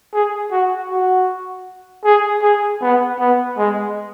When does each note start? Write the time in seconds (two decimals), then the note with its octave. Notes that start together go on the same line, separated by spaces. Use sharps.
0.13 G#4
0.51 F#4
0.90 F#4
2.04 G#4
2.43 G#4
2.82 B3
3.19 B3
3.58 G#3